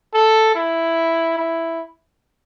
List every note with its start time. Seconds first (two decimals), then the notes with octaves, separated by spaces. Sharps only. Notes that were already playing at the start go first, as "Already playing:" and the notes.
0.14 A4
0.55 E4
1.37 E4